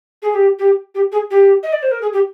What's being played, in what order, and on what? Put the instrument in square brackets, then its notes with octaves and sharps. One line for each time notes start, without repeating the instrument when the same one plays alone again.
[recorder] G#4
G4
G4
G4
G#4
G4
D#5
D5
C5
A#4
G#4
G4